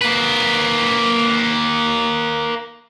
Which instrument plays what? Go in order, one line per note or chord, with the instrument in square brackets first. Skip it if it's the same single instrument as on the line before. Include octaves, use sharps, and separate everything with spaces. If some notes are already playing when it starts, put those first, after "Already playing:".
[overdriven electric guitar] A#3 B4